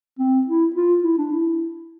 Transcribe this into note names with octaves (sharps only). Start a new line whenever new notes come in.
C4
E4
F4
E4
D4
E4